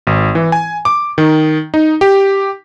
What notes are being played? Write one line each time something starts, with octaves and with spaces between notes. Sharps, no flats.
G#1
E3
G#5
D6
D#3
D#4
G4